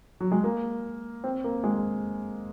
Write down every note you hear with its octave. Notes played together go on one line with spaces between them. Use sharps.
F#3
G#3
A#3
C4
A#3
G#3